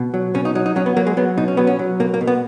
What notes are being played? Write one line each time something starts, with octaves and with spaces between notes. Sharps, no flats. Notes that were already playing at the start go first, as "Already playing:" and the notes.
Already playing: B2
F#3
B2 C#4
D#4
F#3 D#4
D#4
F#3 C#4
B3
F#3 A#3
G#3
F#3 B3
B2 D#4
C#4
F#3 B3
C#4
F#3
B2 A#3
A#3
B2
B3